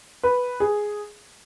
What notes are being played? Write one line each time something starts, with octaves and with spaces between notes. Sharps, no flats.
B4
G#4